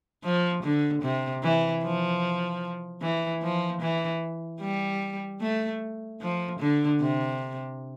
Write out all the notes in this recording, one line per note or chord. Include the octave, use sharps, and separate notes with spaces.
F3
D3
C3
E3
F3
E3
F3
E3
G3
A3
F3
D3
C3